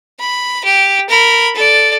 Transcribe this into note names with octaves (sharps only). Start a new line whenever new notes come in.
B5
G4
A#4 B5
A4 D5